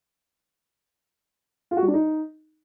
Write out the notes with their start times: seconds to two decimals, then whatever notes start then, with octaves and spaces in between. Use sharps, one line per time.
1.71 F4
1.77 F#4
1.82 G3
1.88 D4
1.94 D#4